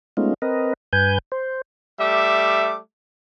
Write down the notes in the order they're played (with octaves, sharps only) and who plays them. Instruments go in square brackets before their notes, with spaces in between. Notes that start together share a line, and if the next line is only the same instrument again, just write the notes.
[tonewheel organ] G#3 A3 B3 C#4 D#4 F4
C4 A#4 B4 D#5
G2 B4 G#5 G6
C5
[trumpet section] G3 A3 E5 D6